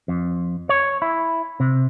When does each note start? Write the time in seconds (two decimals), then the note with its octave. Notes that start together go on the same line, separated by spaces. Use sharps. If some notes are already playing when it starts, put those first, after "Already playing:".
0.08 F2
0.69 C#5
1.02 E4
1.60 C3